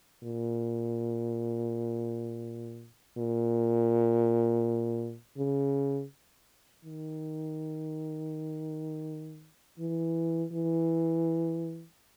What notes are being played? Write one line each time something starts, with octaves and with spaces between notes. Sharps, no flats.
A#2
A#2
C#3
D#3
E3
E3